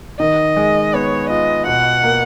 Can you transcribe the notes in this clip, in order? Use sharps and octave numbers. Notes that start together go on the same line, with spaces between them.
D#3 D#5
G#3
B3 C#5
F4 D#5
B2 F#5
A#3